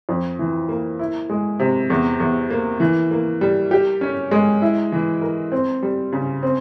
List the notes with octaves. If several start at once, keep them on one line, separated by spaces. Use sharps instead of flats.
F2
E3
A#3
E4
G#3
C3
E2
E2
A#3
E3
A#3
G3
G4
C#4
G#3
E4
E3
A#4
C4
G3
C#3
C4